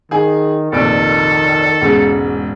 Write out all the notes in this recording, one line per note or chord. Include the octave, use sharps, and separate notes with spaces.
D#3 G#4 G#5
F1 A#1 D#3 A4 D7
E1 G#2 C#3